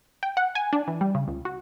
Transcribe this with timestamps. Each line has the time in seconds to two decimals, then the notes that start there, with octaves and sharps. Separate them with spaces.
0.23 G5
0.37 F#5
0.55 G#5
0.73 D4
0.88 E3
1.01 G3
1.15 C#3
1.28 C#2
1.45 F#4